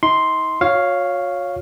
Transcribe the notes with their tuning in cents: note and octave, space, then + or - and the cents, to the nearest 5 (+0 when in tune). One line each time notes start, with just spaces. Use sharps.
D#4 +40 C6 +0
F#4 -45 C#5 +0 F5 +0